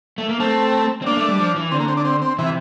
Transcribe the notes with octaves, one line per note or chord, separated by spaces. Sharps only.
A3
A#3
A3 C4
C4
A#3 D4
A3
G3
F3
E3
D3 C4
A#3
C4
D4
C4
C4
C3 E3